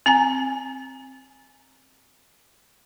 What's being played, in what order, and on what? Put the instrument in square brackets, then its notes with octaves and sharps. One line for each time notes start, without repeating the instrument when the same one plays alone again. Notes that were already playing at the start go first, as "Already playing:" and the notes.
[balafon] C4 G#5 A#5